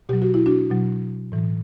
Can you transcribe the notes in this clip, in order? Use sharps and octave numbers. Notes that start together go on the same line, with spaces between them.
B2 F#3 G4
F#4
E4
D4 F#4
B2 F#3
A2 E3